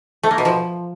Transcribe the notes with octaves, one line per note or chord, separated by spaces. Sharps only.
A3
A#3
B2
F3